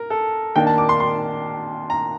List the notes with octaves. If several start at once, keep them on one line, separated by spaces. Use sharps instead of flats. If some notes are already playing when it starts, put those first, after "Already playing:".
Already playing: A#4
A4
D#3 A#3 D4 G5
A5
D6
C6
C6
A#5